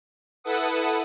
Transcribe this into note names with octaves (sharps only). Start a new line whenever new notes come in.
E4 A4 B4 F#5 D#6